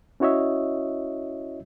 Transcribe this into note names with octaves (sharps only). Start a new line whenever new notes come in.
C#4 E4 F#4 C#5 D#5 E5